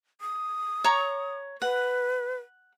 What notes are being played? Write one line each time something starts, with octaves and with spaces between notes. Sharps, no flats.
D#6
C#5 A#5 C#6
B4 F#5